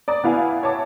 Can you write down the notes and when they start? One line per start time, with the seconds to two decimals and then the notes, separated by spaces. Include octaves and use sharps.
0.08 D5 A#5 D#6
0.24 B3 E4 F5 G#5
0.63 C#5 E5 A5 D6